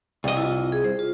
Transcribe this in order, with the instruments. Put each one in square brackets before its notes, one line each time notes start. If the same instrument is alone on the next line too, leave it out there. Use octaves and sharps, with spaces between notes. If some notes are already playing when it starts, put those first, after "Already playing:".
[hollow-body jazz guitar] C2 D#5
[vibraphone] E4 F4
G#4
C5
F4